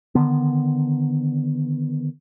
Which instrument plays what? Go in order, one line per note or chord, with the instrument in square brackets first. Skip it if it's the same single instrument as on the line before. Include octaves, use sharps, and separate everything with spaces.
[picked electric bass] D3 D#3 B3